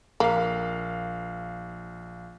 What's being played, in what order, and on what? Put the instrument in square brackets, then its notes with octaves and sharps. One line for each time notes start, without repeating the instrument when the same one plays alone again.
[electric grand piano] A#1 F5 [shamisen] A#3